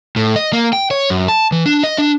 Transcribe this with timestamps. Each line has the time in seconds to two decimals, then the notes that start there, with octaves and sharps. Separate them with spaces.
0.16 A2
0.36 D#5
0.53 A#3
0.73 G5
0.91 C#5
1.10 F#2
1.28 A5
1.52 E3
1.66 D4
1.84 D#5
1.98 D4